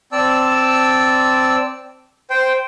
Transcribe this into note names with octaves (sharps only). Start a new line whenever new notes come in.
C4 D5 A5 E6
C5 G5